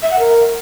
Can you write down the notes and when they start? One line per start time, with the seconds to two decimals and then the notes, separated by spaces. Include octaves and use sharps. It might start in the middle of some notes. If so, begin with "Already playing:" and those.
0.02 E5
0.10 F#5
0.18 A#4